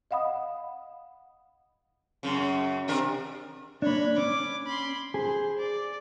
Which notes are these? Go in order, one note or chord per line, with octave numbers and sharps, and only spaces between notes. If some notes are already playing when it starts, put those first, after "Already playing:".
D#5 F5 F#5 B5 D#6
F#2 C#3
C3 D4 A#4
A#3 D4 C#5 B5
C#4 D6
B5 C6
G#4 C5
D5